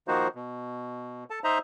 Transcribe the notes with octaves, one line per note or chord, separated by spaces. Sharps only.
D#3 F3 A#3 D#4 F#4 C5
B2
A4 A5
D#4 C5 D#5 E5 A#5